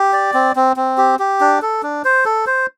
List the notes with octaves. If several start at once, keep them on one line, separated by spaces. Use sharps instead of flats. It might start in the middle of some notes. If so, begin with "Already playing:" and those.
Already playing: G4
D5
C4
C4
C4
G4
G4
D4
A4
D4
C5
A4
C5